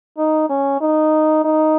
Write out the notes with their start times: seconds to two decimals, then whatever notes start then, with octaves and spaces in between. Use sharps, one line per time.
0.18 D#4
0.49 C#4
0.81 D#4
1.44 D#4